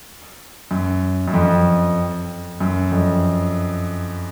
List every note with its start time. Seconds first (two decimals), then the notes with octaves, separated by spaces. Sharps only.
0.71 F#2
1.28 F#2
1.34 F2
2.61 F#2
2.91 F2